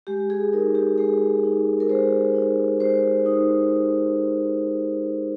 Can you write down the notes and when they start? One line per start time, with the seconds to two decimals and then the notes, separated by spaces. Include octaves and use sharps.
0.07 G#3 G4
0.30 G#4
0.53 D#4 A#4
0.75 G4
0.98 G#3 G#4
1.44 D#4
1.80 A#4
1.89 G#3 C5
2.35 D#4
2.80 G#3 C5
3.26 D#4